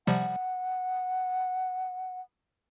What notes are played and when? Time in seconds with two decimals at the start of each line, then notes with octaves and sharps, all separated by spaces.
0.07 C3 F3 G3 F#5